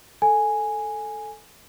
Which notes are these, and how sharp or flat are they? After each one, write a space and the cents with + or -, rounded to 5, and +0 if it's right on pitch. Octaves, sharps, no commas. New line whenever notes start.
A4 +0 G#5 +0